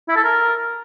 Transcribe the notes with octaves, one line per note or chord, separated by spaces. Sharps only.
E4
A4
A#4